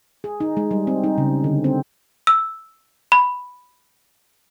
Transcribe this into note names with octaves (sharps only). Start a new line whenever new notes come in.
G#4
D#4
G#3
G3
C4
D#4
C#3
D3
C4
E6
B5